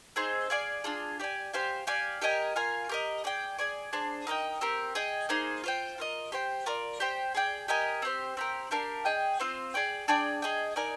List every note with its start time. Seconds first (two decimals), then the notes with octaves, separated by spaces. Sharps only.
0.16 C4 D#4 G#4 C5
0.50 G#4 D5 F5 G#5
0.84 D4 F4 G#4
1.20 G4 D5 G#5
1.53 G4 C5 F5 G#5
1.87 G4 D5 F5 G#5
2.21 G4 A#4 D#5 G#5
2.56 F4 A#4 F5 G#5
2.89 G4 A#4 D#5
3.24 G#4 D5 G5
3.58 G#4 D5 G#5
3.93 D4 G#4 C5
4.27 D#4 A#4 D#5 G5
4.61 C4 G4 A#4
4.95 G#4 D#5 G5
5.29 A#3 D#4 G#4 C5
5.64 F4 C5 G5
5.98 F4 A#4 D#5
6.32 G4 C5 G5
6.66 F4 A#4 D5
7.00 G4 C5 G5
7.35 G#4 D5 G5
7.68 G4 A#4 D#5 G#5
8.02 C4 G4 C5
8.37 C4 G4 A#4
8.71 D4 G4 A#4 F5
9.05 G#4 D#5 G5
9.40 C4 F4 C5 F5
9.74 G#4 D5 G5
10.08 D4 G#4 D5 G5
10.42 G#4 D#5 G5
10.76 D#4 A#4 D5 G#5